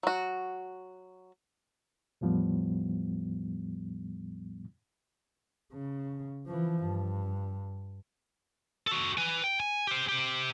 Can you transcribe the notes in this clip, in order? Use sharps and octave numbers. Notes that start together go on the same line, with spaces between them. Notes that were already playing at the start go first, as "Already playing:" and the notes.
F#3 F#4
E2 A2 F3 G3 B3
C#3
E3 F3
G2
F#4 A4
B4 G#5
G5
G#5
G4 C5
G4 C5